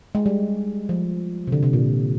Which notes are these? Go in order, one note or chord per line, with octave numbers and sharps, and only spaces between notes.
G#3
G3
F3
C3
D3
C3
A#2